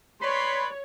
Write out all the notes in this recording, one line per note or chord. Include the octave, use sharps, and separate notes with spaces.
B4 C#5 D5 B5 C6